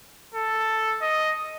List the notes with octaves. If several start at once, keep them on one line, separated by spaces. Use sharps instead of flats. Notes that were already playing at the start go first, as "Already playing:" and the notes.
A4
D#5